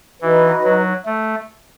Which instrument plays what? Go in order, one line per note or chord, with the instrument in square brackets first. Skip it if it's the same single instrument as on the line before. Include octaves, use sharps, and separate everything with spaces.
[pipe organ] E3 [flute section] D#4 F#4 B4 D#5
[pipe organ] F#3
A3